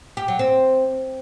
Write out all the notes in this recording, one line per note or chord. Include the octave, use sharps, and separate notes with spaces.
G4
F#3
C4